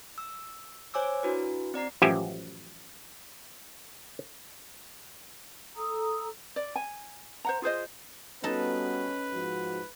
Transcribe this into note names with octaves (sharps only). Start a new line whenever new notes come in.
E6
C5 C#5 G#5 D6 E6
D4 E4 F#4 B4
C4 D5 A#5 C7
A1 F#2 F3 G4 E5 G#5
A4 A#5 D#6 E6
D5
G#5
C5 F#5 A#5
F4 G#4 C5 D#5
G3 B3 C#4 D#4 F#4 A4 B4
G#2 F3 F#4